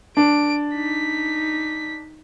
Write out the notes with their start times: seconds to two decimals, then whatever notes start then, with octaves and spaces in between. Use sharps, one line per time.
0.17 D4 D7
0.74 D#4 B6